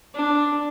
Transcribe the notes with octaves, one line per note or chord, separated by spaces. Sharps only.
D4